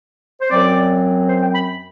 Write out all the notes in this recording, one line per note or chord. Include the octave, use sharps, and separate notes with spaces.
C5
F#2 F#3 C4 D5
C5
G5
B5